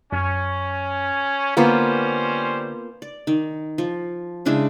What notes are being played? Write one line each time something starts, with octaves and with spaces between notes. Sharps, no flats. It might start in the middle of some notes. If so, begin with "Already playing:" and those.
F#2 C#4
D3 G3 A#3 B3 C#4 F4 C5
D5
D#3
F3
C#3 G#3 D4 E4